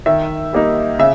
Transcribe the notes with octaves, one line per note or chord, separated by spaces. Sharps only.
D#3 E5
G3 A#3 D#4
C#3 E5